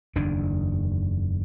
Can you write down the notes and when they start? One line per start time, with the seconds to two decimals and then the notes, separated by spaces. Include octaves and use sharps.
0.16 F#1 E2 D#3 D4